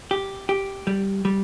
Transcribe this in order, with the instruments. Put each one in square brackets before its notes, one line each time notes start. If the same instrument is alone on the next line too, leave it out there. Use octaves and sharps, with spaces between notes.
[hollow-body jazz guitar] G4
G4
G3
G3